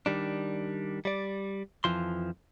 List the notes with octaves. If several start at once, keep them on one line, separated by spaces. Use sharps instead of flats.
D#3 G3 D4
G3 D5
F2 E3 F3 C6